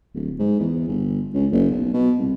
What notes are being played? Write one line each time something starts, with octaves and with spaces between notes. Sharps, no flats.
D1
G#2
E2
G1
C#2
F#1
B1
B2
C2